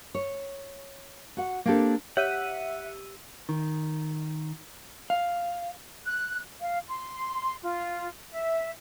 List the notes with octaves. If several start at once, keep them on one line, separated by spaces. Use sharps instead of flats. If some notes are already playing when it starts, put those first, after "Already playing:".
C#5
F#4 F#5
A#3 C4 D4 G4 A4
G4 C#5 E5 F#5 E6 D#7
D#3
F5
F#6
F5
C6
F4
E5